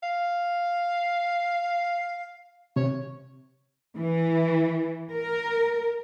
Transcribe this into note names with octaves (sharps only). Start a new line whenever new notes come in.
F5
C3 C#5
E3
A#4